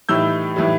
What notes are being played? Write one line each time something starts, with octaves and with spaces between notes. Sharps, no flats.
A2 E3 G3 D#4 E6 G6
A2 E3 G3 D#4